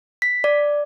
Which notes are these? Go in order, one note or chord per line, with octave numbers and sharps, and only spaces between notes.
B6
D5